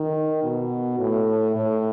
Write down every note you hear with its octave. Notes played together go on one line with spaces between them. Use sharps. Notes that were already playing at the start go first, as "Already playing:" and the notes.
Already playing: D#3
B2
A2
A2